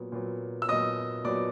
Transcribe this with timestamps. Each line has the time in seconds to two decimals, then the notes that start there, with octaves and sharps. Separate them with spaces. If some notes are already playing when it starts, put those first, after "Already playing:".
Already playing: A#2 F#3 B3
0.12 A#2 F#3 B3
0.62 E6
0.69 A#2 F#3 B3 D#5 D#6
1.24 A#2 F#3 B3 D5 D6